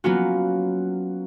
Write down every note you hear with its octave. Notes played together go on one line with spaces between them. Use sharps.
F#3 A#3 B3 C#4 F4 F#4